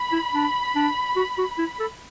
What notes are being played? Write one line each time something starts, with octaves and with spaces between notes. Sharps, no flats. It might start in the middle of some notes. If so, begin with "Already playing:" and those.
Already playing: B5
E4
D4
D4
F#4
F#4
E4
A4